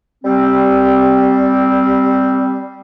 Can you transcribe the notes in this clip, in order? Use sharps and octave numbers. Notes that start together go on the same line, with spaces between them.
G3 C4